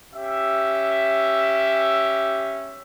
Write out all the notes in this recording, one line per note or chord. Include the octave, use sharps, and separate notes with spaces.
C#4 G4 E5